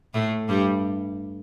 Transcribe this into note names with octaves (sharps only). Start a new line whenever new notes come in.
A2 A3
G2 G3